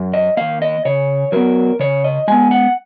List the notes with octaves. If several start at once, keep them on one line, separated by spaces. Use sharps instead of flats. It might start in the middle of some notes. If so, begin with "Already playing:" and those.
Already playing: F#2
D#5
D#3 A#3 F5
D#5
C#3 C#5
F#3 B3 A#4
C#3 C#5
D#5
G#3 B3 G#5
F#5